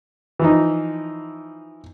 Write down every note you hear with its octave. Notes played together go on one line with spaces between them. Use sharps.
E3 F3 D#4